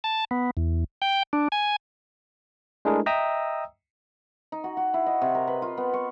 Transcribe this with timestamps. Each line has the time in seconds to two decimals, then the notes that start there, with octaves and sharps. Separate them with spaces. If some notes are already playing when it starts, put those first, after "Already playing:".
0.04 A5
0.31 B3
0.57 E2
1.02 G5
1.33 D4
1.52 G#5
2.85 G#3 A3 D4 E4 G#4 A#4
3.06 D#5 E5 G5 A#5 D#6 E6
4.52 D#4
4.64 F#4
4.77 F#4
4.94 E4
5.06 D#5
5.21 C3
5.35 A#4
5.48 B4
5.62 F4
5.77 B3
5.94 C#6